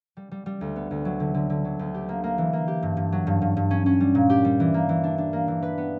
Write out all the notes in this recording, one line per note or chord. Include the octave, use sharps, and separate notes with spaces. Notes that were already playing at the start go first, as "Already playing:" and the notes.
G3
G3
G3
D2
B3
D2
F#3
D3
D3
D3
F#3
D2
G4
A#3
A#3
E3
A#3
G4
G2
G2
F#3
G2
G2
G2
C#4
C#4
G3
A#2
G4
G3
E3
A#3
E3
D4
D4
A#3
E3
B4
B3